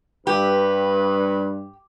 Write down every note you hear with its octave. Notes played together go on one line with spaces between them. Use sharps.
G2 G4 B4